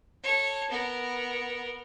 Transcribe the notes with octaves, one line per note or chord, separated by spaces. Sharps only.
A4 C#5
B3 A#4